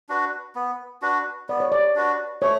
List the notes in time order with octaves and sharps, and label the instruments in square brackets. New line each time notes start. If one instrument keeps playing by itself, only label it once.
[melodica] D4 F#4 B4
B3
D4 F#4 B4
[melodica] B3 [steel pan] D5
[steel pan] C#5
D5
[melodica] D4 F#4 B4
[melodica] A3 [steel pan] C#5